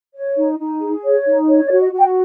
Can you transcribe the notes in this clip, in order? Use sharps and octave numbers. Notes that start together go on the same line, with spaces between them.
C#5
D#4
D#4
G#4
C#5
D#4
C#5
D5
F#4
D#5
F#4
G5